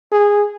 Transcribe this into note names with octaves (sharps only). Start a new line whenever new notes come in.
G#4